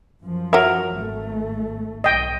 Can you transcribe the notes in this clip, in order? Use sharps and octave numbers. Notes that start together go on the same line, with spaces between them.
F#2 F3
F#3 A#4 E5
G#1 A3
B1 D#5 G5